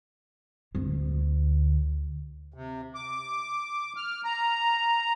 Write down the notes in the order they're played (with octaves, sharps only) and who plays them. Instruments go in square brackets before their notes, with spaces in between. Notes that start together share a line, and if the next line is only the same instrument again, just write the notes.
[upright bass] D2 D3
[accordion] C3
D6
F6
A#5